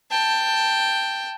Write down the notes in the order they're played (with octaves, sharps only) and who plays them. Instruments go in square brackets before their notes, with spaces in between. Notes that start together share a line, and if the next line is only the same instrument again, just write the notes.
[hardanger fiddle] G5 A5